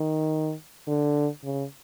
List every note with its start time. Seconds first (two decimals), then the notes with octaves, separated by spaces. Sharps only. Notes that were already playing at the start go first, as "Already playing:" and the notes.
Already playing: D#3
0.87 D3
1.44 C#3